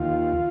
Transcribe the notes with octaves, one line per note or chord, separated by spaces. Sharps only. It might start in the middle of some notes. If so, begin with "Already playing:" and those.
Already playing: D#2 F4